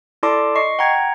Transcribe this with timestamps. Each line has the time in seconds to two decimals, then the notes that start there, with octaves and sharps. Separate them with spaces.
0.23 E4 A4 D5 A5 C6 D6
0.55 D#5 C#6 C7
0.79 F#5 G5 A#5 G#6